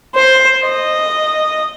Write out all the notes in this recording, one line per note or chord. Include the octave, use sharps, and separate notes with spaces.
C5
D#5